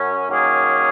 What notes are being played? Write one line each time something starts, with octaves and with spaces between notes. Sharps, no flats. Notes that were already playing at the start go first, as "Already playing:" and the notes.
Already playing: F#2 F#3 C#4 F#4
D#3 F#3 A#3 C#4 G#4